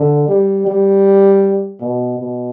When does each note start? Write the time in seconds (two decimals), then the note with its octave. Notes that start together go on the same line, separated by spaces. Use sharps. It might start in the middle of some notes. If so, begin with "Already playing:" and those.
Already playing: D3
0.28 G3
0.67 G3
1.80 B2
2.19 B2